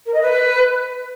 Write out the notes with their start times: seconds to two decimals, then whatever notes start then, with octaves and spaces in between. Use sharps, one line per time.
0.06 A#4
0.14 D#5
0.21 B4